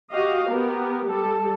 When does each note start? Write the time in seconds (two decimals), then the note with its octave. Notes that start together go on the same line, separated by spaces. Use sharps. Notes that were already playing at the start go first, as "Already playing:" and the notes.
0.11 F#4 G4 D#5 F5
0.47 B3 G4 A#4
1.07 G3 A4